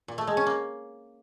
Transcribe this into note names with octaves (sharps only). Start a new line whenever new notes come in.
A#2
A3
G#3
C#4
A#3